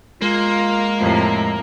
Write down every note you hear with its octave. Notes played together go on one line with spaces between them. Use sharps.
G#3 A#3 F4
F2 A2 C3